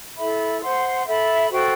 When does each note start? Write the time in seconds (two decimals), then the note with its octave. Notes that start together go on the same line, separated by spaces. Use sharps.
0.17 E4 A4 E5 B5
0.62 C5 F#5 C6
1.06 A4 E5 B5
1.51 F#4 A4 C5 G5